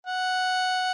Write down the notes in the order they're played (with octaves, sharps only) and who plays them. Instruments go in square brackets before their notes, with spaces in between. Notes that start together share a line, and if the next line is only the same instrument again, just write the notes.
[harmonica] F#5